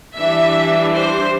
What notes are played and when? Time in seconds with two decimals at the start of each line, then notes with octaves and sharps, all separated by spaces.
0.15 E3 G3 D4 E5
0.92 C5